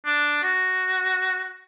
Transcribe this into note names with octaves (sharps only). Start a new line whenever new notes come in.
D4
F#4